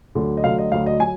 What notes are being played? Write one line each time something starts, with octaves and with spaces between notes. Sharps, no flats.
D2 D3 F#3
D#5
D2 D3 F#3 F5
D#5
D2 D3 F#3 F5
D#5
F#3 G#5